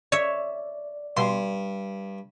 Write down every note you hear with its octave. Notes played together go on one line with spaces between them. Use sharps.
C#5 D5 E5
G2 B2 C6